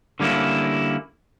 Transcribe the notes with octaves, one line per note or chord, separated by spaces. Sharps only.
D3 G3 A#3 C#4 E4